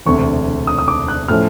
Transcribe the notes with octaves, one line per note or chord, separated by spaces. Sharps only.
E1 D2 C3 C#6
D#6
D#6
D6
F#6
A2 F3 A3 C#4 F6